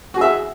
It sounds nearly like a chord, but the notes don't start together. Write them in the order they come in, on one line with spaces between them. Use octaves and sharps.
F#4 G#4 E5